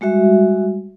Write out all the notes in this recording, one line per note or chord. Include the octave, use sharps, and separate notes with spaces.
G3 G#3 F#4 E5